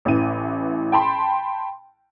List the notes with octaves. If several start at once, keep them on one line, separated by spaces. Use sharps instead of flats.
A1 E3 D#7
G5 A5 B5 C6